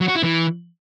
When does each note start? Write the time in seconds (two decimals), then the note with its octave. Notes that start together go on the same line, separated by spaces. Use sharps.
0.01 F#3
0.08 F#4
0.16 E4
0.23 E3